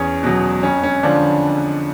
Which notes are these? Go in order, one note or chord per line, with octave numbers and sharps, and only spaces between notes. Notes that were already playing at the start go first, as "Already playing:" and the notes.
Already playing: E2 C#4
B2 F#3
F2 C#4
C#4
D3 F3 D4